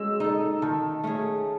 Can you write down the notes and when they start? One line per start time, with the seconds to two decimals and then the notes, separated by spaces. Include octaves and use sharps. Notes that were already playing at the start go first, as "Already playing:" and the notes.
Already playing: G#3 C#4 F#4 E6
0.20 D#4 A4
0.62 D#3 A5
1.04 A3 C#4 G#4